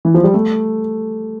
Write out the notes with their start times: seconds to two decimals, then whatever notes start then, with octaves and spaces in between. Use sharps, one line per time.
0.05 E3
0.14 F3
0.24 G3
0.34 A3